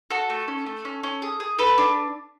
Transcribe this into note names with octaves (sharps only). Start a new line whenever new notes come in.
F#4 A4
A3
C#4
A3
C#4
C#4
G#4
G#4
A4 B4
D4